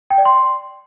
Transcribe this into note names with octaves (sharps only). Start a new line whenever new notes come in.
G5
D5
C6